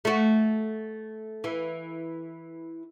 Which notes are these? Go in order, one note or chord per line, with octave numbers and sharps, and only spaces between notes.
A3 F#4
E3